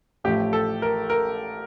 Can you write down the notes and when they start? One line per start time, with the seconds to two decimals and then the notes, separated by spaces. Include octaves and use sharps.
0.24 A1 A2 F3 A3 G4
0.53 A4
0.82 A#4
1.10 A#4